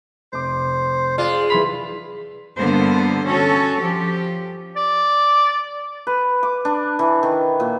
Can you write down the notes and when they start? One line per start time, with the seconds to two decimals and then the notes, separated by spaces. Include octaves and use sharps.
0.32 F1 C5 D6
1.18 G#3 F4 D5
1.50 E3 B5 C6 F7
2.58 G2 D3 A#3 B3 C5
3.25 C#4 F#4 A4 C#5
3.80 F3 G4
4.76 D5
6.07 B4
6.43 D6
6.65 D4
6.99 E3
7.23 D#3
7.60 A#2